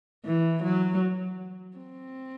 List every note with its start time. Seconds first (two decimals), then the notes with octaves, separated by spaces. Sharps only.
0.25 E3
0.63 F#3
1.77 C4